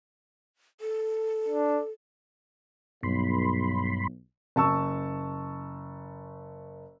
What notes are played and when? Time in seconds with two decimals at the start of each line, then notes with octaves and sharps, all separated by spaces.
0.81 A4
1.48 D4
3.03 B1 G2 B5 C6
4.56 F#1 A5 C#6 E6